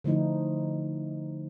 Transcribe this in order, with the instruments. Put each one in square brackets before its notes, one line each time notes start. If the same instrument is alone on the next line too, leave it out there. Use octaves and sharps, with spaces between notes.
[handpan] D3 F3 A3 D#4 E4